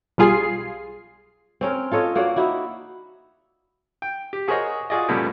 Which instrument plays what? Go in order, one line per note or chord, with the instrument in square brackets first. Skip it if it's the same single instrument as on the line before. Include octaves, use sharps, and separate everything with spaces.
[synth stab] B1 G3 F4 G#4 C7
[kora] C4 C#4 A#4
F4 A4 C#5 D#5
A#3 F#4 C#5 D5
D#4 E4 F#4
[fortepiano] G5
G4
F#4 G#4 A#4 C5 C#5 D#5
F4 F#4 G#4 D5 D#5
F#2 A#2 C#3 G3 A3 B3